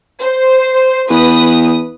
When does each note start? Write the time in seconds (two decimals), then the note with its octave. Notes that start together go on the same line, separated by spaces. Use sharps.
0.19 C5
1.10 E2 B4 D#6